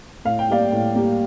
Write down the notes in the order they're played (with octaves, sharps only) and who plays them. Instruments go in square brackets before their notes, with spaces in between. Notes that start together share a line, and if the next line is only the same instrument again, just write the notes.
[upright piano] A2 F5
G5
G3 A#3 D5 F5
A2
G3 A#3